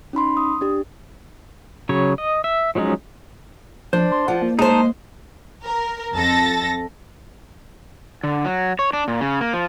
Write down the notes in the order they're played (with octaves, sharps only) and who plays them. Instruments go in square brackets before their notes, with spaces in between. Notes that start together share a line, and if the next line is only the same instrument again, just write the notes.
[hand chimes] C#4 D#4 B5 C6
D#6
D4 G4
[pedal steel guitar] C#3 F#3 C#5
D#5
E5
F3 F#3 G#3 C#4 D#4
[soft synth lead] F3 [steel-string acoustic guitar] D4 [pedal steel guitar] C5
[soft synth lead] C6
[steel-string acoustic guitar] F3 [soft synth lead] F#5
[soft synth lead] A#3
[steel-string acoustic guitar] G#3 C5 [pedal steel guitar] D#4 A5
[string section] A#4
F2 A4 A6 A#6
[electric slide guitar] D3
F#3
C#5
D4
A#2
C#3
A#3
F3